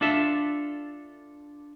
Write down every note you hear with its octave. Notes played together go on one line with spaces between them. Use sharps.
D4 F4 A4 E5